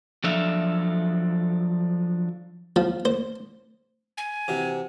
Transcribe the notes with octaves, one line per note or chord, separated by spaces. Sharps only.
F3 F#3 D4 A4 E5 F5
F3
C5
G#5
C3 E3 F#4